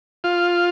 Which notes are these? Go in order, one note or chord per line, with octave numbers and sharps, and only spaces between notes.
F4